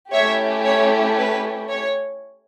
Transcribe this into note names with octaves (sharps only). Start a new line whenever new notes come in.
A3 C#4 E4 G4 C#5 E5
C#5
B4
C#5